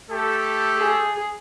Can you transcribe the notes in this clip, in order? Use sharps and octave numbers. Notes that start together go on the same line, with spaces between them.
A3 G4 A4
G#4